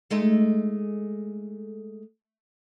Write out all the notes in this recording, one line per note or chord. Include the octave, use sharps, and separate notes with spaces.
G#3 A3 D#4